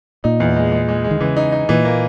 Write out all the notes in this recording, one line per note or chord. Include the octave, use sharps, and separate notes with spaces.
A#2 D#4
E2
G#3
G#3
G#3
G#3
D#3
C#3 E3
D#4
D#4
A#2 E3
A#3